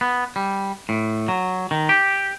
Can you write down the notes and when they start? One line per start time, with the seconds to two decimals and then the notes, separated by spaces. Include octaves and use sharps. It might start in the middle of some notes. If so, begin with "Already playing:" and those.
0.01 B3
0.36 G3
0.89 A2
1.28 F#3
1.71 D#3
1.89 G4